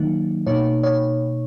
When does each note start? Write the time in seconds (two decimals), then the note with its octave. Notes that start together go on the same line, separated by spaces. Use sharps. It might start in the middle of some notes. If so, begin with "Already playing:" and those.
Already playing: D#3 F#3 A#3 D#4
0.47 B2 A#3 D#4 C#5
0.83 C#5